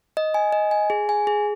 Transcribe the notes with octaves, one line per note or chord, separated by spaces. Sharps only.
D#5
G#5
D#5
G#5
G#4
G#5
G#4